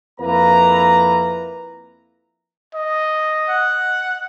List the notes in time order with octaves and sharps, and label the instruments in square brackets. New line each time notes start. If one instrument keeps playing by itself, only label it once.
[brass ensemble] F2 A#3 E4 B4 A#5
[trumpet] D#5
[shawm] F#5